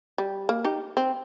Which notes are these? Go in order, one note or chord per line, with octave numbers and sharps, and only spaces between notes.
G3
A#3
D#4 G4
C4